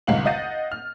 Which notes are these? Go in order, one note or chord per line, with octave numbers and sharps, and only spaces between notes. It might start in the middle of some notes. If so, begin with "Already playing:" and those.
G#1 C#2 G2 F5 F#5 F#7
D#5 F5 F#5 G6 A6 D#7
F6